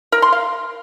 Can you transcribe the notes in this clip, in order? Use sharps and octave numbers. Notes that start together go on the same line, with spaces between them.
A#4
C6
F5